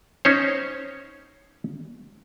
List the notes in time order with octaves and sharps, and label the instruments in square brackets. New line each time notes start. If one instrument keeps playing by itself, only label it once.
[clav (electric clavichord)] C#4 D#4 C5 C#5